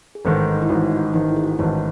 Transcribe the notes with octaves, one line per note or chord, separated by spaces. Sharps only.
G#4
A1 G#2 D#3 A4
D#4
E4
A1 G#2 D#3 F#4
D#4
A1 G#2 D#3 D#4
E4
G#4
F#4
A1 G#2 D#3 D#4